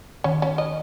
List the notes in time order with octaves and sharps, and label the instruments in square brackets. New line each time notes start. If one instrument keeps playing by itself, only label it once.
[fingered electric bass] D#3 [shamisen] C#4
[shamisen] C#4
D#5